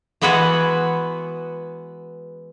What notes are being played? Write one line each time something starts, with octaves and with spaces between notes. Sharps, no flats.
E3 G#3 B3 F#4 G#4 B4